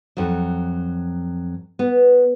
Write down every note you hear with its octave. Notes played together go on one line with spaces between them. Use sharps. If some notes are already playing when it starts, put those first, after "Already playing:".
F2 F#3
B3